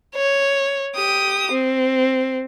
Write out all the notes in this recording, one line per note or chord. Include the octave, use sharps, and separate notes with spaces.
C#5
G4 D#6
C4